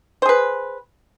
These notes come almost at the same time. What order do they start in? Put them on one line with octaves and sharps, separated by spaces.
C5 G#4 B4